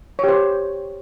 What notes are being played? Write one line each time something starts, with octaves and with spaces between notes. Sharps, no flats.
G4 C5 C#5